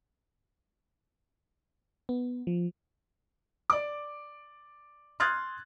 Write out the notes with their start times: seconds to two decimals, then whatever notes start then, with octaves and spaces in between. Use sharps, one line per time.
2.09 B3
2.47 F3
3.70 D5 D6
5.20 C6 D#6 F6 F#6 G#6 A6